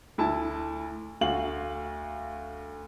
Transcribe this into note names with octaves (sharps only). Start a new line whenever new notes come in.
D2 E4 A5
D2 F#4 F5 F#7